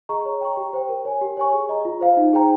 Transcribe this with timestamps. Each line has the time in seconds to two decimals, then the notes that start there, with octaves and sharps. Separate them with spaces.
0.09 G#4 D#5 A#5 C#6
0.25 C#5
0.41 G5 A#5 C#6
0.57 G4
0.73 C5 G5
0.89 A#4
1.05 C#5 G#5
1.21 G4
1.37 C#5 G#5 C#6
1.53 G#4
1.69 D#5 A#5
1.85 F4
2.01 C5 F5
2.17 D#4
2.33 G#4 C5 G5 A#5